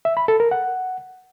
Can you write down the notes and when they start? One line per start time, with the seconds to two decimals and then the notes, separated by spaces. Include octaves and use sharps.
0.05 E5
0.17 B5
0.28 A4
0.40 A#4
0.51 F#5